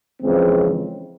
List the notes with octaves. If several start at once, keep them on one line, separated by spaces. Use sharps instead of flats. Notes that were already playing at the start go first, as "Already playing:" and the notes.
F2 C#3 E3 G#3 C4